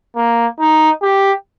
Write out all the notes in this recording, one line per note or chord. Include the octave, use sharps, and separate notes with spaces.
A#3
D#4
G4